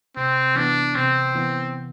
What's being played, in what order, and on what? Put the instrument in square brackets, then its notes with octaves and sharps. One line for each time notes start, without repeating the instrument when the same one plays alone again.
[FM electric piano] C3 [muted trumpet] C4
[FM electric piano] E3 B3 [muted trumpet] D4
[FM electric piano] C3 [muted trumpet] C4
[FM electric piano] E3 B3